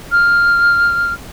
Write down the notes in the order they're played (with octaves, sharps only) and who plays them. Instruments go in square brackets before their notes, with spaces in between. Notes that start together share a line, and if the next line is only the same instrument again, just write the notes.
[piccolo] F6